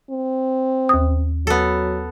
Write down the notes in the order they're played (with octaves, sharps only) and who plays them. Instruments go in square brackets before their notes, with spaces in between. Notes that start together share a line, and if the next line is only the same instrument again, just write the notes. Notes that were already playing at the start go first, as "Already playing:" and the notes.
[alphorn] C4
[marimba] D#2 D#6
[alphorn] F#3 [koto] B3 A4